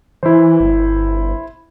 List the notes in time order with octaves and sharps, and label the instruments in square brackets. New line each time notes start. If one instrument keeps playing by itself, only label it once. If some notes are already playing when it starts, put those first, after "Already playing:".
[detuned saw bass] E3 [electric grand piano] E4 C5
[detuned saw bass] G1